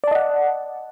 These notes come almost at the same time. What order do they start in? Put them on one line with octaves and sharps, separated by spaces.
D5 A5 D#5 F#5